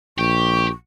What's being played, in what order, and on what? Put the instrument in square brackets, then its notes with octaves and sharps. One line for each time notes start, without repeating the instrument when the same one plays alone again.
[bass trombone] A#1 [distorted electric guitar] G4 [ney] C#6